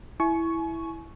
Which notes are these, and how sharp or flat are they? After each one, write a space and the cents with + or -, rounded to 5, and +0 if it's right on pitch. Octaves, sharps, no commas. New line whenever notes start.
E4 +0 G#5 +35 C#6 +0